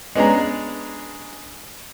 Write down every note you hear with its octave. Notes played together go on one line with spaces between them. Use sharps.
G#3 B3 C#4 D4 G#4 A#5